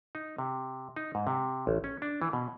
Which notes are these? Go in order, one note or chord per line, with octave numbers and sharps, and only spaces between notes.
D#4
C3
D#4
G#2
C3
A1
C#4
D4
E3
B2